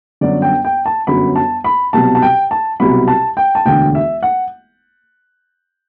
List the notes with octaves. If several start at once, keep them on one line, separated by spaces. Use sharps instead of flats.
G1 F#2 D3 F#3 D5
G5
G5
A5
G1 F#2 D3 F#3 B5
A5
B5
C2 B2 F#3 A5
A5
G5
A5
C2 B2 F#3 B5
A5
G5
A5
E1 D2 D3 G5
E5
F#5